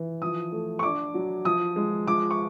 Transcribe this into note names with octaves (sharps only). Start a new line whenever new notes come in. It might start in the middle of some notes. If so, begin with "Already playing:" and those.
Already playing: E3
F3 D#6
A3
C#6
D4 D6
F#3
F3 D#6
G#3
F3 D6
C#6